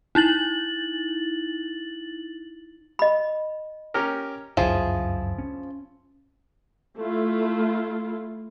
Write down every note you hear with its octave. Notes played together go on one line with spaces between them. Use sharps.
D#4 E4 A6 F#7
D#5 B5
C#4 G4 A#4
G1 C#2 F#2 F3 E4 G#4
C#4
A3 E4 F4